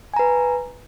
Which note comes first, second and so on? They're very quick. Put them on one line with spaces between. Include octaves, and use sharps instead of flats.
G#5 A#5 B4